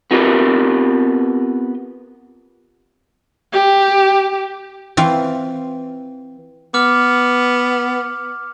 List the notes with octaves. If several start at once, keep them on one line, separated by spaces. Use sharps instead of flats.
B3 C4 F4 G4 A#4 B4
G4
E3 C4 F4
B3 D6 F6